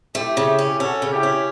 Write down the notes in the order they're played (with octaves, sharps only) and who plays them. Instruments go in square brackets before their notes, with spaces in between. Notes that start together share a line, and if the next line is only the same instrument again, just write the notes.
[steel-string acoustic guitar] A3 [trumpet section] E4 G4
[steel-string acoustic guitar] C#3
C#4
[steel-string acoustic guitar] C#4 [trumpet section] F#4 A4
[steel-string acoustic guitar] C#3
[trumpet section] E4 G4
[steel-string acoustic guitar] C#4